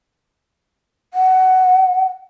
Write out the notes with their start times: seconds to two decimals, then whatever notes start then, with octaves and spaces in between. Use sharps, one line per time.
1.14 F#5